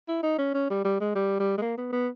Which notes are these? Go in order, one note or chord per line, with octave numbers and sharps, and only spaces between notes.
E4
D#4
C#4
C#4
G3
G3
G#3
G3
G3
G#3
A#3
B3
B3